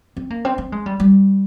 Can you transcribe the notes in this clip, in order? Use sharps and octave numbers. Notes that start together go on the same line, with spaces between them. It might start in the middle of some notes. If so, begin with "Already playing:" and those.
C4
A#3
C4
C4
G#3
G3
G3